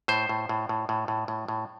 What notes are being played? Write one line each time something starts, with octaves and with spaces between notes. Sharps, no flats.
A2 C5
A2
A2
A2
A2
A2
A2
A2